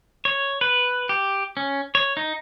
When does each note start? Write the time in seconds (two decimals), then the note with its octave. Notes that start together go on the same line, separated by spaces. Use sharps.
0.25 C#5
0.61 B4
1.09 G4
1.57 C#4
1.95 C#5
2.17 D#4